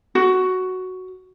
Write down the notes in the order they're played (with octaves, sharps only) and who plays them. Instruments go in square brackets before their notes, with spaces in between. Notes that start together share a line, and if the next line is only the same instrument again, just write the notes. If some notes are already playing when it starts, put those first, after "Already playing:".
[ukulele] F#4